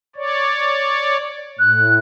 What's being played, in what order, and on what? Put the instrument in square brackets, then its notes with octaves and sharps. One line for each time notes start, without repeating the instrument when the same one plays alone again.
[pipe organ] C#5 D5
[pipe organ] A2 [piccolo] F#6